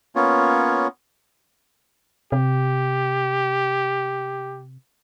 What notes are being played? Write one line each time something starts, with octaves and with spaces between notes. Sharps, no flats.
A#3 B3 C#4 F4 C#5
C3 G4